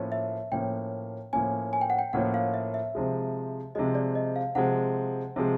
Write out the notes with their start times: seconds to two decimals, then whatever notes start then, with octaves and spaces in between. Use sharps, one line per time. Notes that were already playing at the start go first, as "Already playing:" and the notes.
Already playing: A2 F3 A#3 C#4
0.12 E5
0.52 A2 F3 A#3 C#4 G5
1.33 A2 F3 A#3 C#4 G#5
1.73 G#5
1.81 G5
1.90 F#5
1.99 G5
2.13 A2 F3 A#3 C#4 F#5
2.34 F5
2.54 E5
2.74 E5
2.95 C3 F3 G#3
3.75 C3 F3 G#3 D#5
3.95 D5
4.15 D#5
4.36 F5
4.55 C3 F3 G#3 F#5
5.36 C3 F3 G#3